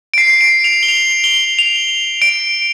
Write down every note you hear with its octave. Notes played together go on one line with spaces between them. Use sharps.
D7
C7
C7
D7
F7
G7
F7
G7
F7
D7